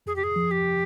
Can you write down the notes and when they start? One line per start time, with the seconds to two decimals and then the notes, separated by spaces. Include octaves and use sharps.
0.06 F2 G#4
0.16 G4
0.23 G#4
0.36 F3
0.51 G4